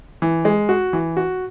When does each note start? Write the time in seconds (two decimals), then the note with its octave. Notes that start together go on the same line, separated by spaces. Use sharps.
0.22 E3
0.45 G#3
0.69 F#4
0.93 E3
1.17 F#4